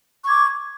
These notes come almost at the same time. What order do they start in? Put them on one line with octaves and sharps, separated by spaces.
C#6 G#6 D6